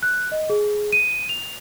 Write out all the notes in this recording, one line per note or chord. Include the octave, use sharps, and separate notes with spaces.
F#6
D#5
G#4
D#7
F7